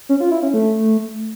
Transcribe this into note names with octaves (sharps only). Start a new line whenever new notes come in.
C#4
F4
E4
C#4
A3